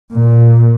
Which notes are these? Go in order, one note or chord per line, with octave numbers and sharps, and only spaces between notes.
A#2